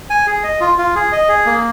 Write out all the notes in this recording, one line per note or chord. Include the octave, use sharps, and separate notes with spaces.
G#5
G#4
D#5
F4
F4
G#4
D#5
G#4
A#3